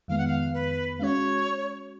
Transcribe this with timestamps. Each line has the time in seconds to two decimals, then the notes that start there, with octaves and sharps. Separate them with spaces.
0.08 F2 D#3 G#3 B3 F5
0.18 F#5
0.28 F5
0.53 B4
0.99 G#3 C#4 F#4 C#5 F5